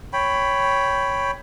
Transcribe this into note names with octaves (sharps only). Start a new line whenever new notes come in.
C#5 G5 B5